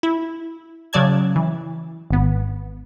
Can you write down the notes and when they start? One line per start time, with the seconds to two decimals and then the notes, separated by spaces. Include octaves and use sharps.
0.03 E4
0.93 C#3 F#3 D5 A5 G#6
1.36 E3
2.10 G#1 B3